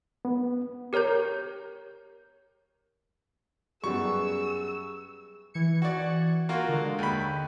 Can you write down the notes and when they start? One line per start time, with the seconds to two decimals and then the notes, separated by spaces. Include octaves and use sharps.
0.25 B3
0.93 G4 A#4 C#5 A#5 G6
3.84 F#2 G3 B3 G#4 C#6 E6
5.54 E3 G#6 C#7
5.82 F#4 D5
6.49 A#3 F4 F#4
6.69 D3 G#3
6.98 D#2 B5